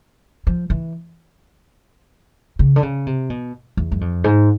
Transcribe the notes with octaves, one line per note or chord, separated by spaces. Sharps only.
F3
E3
C#3
D3
C#3
C3
B2
E2
F#2
F2
G#2